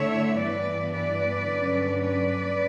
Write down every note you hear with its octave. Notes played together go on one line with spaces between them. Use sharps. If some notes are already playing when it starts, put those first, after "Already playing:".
Already playing: D3 A3 E4 C#5 E5
G2 E3 B3 B4 D5
B4 D5
G2 D3 F#3 C#4
B4 D5